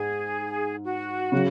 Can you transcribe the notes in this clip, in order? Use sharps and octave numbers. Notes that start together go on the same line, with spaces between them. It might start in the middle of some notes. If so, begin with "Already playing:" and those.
Already playing: G#2 G#4
F#4
C#3 F#3